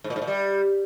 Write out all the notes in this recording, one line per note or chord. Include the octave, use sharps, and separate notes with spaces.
G#2
A#2
G#2
A#2
G3